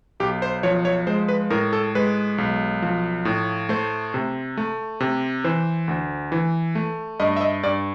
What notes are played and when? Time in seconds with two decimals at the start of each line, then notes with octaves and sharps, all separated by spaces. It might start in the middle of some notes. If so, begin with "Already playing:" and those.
0.20 B1 G4
0.42 C5
0.63 F3 C#5
0.85 C#5
1.07 G#3 C5
1.28 B4
1.50 A2 A#4
1.73 A4
1.95 G#3 B4
2.38 B1
2.82 F3
3.25 A2
3.69 A3 C5
4.14 C3
4.57 A3
5.00 C3
5.44 E3 C5
5.88 D2
6.32 E3
6.75 A3
7.20 G2 D#5
7.36 E5
7.41 D#5
7.63 G2 D5